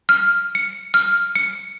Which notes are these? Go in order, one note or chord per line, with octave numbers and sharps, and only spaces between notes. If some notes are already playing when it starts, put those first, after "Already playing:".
F6
C#7
F6
C#7